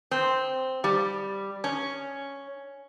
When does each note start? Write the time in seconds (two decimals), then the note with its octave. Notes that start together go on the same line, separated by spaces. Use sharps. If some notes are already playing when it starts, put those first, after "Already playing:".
0.11 C4
0.84 G3
1.64 C#4